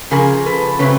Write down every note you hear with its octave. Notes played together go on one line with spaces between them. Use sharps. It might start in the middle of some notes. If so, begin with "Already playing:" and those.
C#3 F3 G#4 A#4
A4 B4
C#3 F#3 A3 C4 B4 C#5